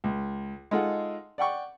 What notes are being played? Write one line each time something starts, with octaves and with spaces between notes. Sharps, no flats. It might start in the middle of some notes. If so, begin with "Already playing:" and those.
C#2
G#3 D#4 F4 A4 F#5
D5 F#5 G5 C#6